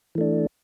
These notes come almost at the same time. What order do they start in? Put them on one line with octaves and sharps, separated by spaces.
E3 A3 D4